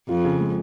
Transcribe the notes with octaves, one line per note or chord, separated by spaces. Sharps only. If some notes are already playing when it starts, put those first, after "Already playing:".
F2 F4
C#3
G#3